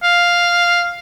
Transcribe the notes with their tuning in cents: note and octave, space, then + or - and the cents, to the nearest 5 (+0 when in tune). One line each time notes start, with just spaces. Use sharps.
F5 +0